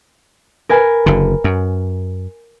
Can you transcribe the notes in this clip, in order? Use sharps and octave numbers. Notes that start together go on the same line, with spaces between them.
A#4 B4 G#5
F#1 D3
F#2